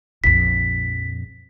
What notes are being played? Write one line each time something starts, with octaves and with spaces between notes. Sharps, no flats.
A#1 F2 B6